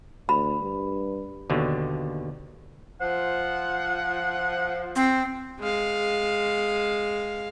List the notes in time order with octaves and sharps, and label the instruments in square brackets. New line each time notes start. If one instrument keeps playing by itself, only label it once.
[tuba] D2 [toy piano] B5
[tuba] G2
[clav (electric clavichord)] D#2 B2 D3
[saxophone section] F3 C5 [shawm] F#5
[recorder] C4
[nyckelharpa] G#3 F5